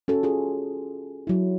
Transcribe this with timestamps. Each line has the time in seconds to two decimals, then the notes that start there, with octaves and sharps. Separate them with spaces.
0.08 C#4 F#4 A4
0.23 F4 G#4 A4
1.27 F#3 E4